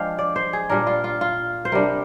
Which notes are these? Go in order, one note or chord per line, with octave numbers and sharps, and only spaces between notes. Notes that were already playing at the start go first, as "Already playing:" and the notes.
Already playing: F3 G#3 D4 F5 G5
D5
C5
G#4
A#2 G3 D4 A#4
F4
F4
F4
C5
C3 G3 D4 A#4